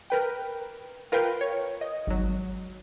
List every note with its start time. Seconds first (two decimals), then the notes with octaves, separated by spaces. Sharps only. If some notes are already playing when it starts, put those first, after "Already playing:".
0.10 A#4 B4 G5
1.12 F4 A#4 B4 F5 G5
1.41 C#5
1.81 D#5
2.07 G#1 F#3